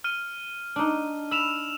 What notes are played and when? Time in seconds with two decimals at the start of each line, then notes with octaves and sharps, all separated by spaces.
0.04 F6 D#7
0.76 D4 D#4
1.31 B5 E6 E7 F7